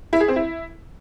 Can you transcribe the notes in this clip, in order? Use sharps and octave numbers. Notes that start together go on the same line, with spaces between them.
E4
G#4
C4
E4